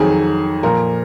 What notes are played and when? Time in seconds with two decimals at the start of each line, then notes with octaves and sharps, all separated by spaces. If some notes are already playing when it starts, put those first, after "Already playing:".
Already playing: F2 D#3 F#3 G#4
0.63 A#2 F3 A#4